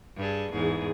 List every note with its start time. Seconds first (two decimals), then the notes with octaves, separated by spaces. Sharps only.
0.17 G2 G#4 A4
0.52 E2 G#2 G#4